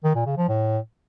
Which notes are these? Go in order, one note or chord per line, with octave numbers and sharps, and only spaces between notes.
D#3
A#2
C#3
F3
A2